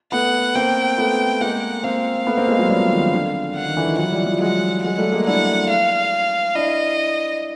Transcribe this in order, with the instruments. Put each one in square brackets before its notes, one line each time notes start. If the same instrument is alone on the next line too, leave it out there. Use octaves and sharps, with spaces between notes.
[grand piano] A3 B3 [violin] F#5
[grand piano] A#3 C4 [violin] G5
[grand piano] A3 B3
[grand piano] G#3 A#3 [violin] F#5
[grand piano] A#3 C4 [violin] F5
[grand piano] A3 B3
A#3 C4
G#3 A#3
F#3 G#3
F3 G3
D#3 F3
D3
[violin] F#5
[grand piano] D#3
D3 E3
D#3 F3
[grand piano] E3 F#3 [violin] F#5
[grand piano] F3 G3
F3 G3
[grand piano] F#3 G#3 [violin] F#5
[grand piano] F#3 G#3 [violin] F#5
[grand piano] G3 A3
G#3 A#3
[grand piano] D4 E4 [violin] F#5
[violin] F5
[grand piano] D4 E4 [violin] D#5